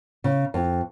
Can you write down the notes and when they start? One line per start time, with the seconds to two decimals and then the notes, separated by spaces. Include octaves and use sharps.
0.24 C#3
0.54 F2